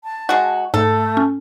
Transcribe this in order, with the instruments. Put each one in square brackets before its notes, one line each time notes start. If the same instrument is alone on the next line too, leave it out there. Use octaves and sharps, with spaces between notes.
[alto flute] A5
[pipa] G#3 F#4
[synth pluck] G#2 [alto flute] A3 [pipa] A4
[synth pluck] C#4